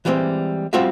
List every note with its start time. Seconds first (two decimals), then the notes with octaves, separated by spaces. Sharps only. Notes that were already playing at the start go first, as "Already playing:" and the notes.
0.05 E3 G3 G#3 A#3 C4
0.73 G3 C4 F4 F#4 E5